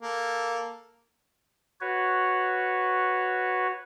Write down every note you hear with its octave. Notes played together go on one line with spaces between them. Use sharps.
A#3 A4
F#4 B4 C#5